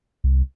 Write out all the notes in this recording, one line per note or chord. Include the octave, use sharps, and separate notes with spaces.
C2